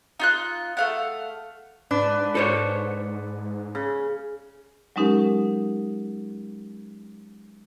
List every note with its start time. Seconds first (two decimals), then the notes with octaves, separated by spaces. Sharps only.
0.19 D#4 F4 F#6
0.77 A3 F5 F#5
1.91 G#2 D4 B4
2.35 A4 C5 C#5
3.75 C#3
4.96 F#3 G#3 C#4 D#4 G4 A#4